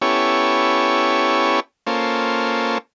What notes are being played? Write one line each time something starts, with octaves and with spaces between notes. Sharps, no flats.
B3 C#4 E4 G4 A4 C#5
A#3 C#4 F4 A4 C5